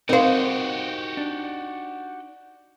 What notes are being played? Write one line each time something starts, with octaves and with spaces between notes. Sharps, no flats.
C4 D#4 F#4 G4 A#4 C5 F5
D4